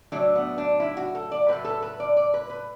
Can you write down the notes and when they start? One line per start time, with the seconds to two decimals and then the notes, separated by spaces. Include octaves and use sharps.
0.12 A2 F#3 A3 D4
0.35 B3
0.58 D4
0.80 E4
0.97 F#4
1.15 A4
1.31 D5
1.48 A2 F#3 A3 B4
1.65 A4
1.82 B4
2.00 D5
2.16 D5
2.34 B4
2.50 B4